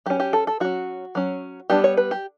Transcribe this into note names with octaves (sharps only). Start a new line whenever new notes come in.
F#3 C#4 G4
G4
A4
A4
F#3 C#4 F#4
F#3 C#4
G3 B3 D4 G4
C#5
B4
G4